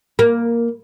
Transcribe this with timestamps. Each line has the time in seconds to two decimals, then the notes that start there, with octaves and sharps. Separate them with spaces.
0.19 A#3